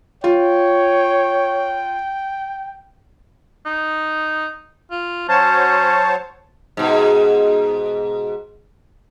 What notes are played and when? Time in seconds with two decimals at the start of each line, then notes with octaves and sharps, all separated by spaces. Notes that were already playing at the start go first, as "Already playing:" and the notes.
0.24 F4 C#5 G5
3.66 D#4
4.91 F4
5.28 F#3 C#4 C5 C#5 A5
6.77 G#2 B2